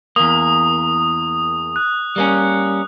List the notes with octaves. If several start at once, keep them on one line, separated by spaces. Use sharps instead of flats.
E2 A#3 D#6
F#6
G3 A#3 C#4